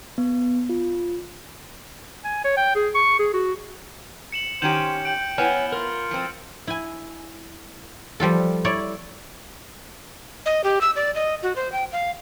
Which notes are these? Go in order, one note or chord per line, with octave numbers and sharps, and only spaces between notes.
B3
F4
G#5
C#5
G5
G#4
C#6
G#4
F#4
C#7 E7 F#7
D#3 C#4 G4 C5 G6 E7 F#7
G5 D7 F#7
B3 E4 C#5 F#5 G#5 F6 C#7 E7
F4 A#4
F3 C4
E4 G#5
F3 G3 F4 A4
E4 C#5 D5
D#5
G4
E6
D5
D#5
F#4
C5
G5
F5